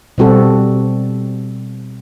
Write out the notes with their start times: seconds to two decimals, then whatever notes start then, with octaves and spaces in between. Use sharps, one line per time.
0.18 B2 G3 C4 F#4 A4